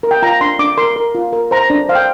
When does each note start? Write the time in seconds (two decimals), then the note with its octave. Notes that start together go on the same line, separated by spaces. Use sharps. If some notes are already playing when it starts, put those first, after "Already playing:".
0.03 A#4
0.11 G5
0.22 F4 A#5
0.41 D4 C6
0.59 D4 D6
0.78 A#4 C6
0.96 A#4
1.15 F4
1.33 A#4
1.51 C5 A#5
1.70 D4
1.89 C5 F5
1.95 G5